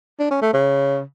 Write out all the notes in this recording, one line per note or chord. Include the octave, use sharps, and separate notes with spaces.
D4
C#4
A3
C#3